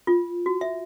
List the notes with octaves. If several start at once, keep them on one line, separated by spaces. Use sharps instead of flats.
F4
F#4
E5